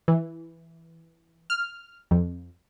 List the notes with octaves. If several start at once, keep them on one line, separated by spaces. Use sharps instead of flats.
E3
F6
F2